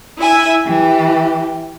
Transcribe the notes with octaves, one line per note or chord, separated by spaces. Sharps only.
E4 E5 G#5
E3 G4